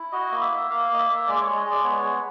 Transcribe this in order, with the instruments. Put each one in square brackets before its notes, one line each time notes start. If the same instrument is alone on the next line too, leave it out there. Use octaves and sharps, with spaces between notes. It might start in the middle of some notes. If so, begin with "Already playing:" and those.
Already playing: [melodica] E4
F#4 D#5
A#3
E5
A#3
A#3 F5
A#3 D#5
E5
A#3
G#3 D5
C#5
G#3
D#5
G#3
D5
B3 C#5
G#3